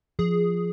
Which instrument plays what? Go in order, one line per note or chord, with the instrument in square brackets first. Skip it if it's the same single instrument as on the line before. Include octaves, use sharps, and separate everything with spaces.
[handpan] F3 [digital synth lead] G#4